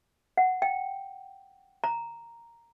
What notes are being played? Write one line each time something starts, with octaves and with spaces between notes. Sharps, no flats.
F#5
G5
A#5